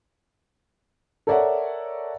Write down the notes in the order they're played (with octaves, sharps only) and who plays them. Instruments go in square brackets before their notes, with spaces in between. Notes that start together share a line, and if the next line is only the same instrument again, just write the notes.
[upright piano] A4 A#4 C#5 D5 E5 F#5